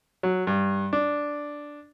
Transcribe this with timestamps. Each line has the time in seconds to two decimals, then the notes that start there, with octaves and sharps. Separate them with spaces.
0.23 F#3
0.47 G2
0.93 D4